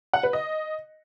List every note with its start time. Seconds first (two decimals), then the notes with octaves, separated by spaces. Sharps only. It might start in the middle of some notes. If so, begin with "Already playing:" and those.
0.14 F#5
0.23 B4
0.33 D#5